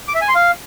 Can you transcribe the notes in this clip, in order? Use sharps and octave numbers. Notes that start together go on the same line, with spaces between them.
D6
E5
G#5
C6
F5